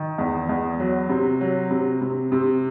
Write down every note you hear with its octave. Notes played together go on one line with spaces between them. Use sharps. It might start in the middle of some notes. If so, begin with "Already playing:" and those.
Already playing: D#3
E2
E2
F#3
C3
F#3
C3
C3
C3